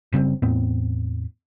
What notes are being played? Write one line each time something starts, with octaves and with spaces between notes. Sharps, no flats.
F#1 C#3 G3 C4
E2 A2 B3 C4